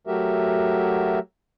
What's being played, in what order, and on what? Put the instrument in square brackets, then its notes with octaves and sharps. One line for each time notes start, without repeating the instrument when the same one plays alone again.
[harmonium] F#3 A3 F#4 G4 A#4 E5